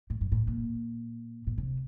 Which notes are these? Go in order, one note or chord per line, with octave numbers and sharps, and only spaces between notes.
A2
G2
A2
A#2
A#2
C3